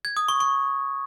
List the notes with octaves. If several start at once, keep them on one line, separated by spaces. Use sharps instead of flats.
G#6
D#6
C#6
C#6